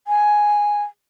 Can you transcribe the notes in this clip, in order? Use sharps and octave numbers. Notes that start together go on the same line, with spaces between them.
G#5